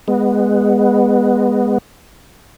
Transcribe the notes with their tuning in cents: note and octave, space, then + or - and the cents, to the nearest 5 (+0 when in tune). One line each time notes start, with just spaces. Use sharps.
G#3 -20 B3 +0